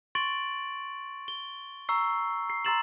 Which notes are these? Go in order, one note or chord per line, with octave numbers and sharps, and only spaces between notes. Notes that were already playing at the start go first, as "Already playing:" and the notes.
C6 C#6 A6 D7 F#7
G7
A#5 C#6 E6 C7
C7
A#5 C6 E6 A6 E7 F#7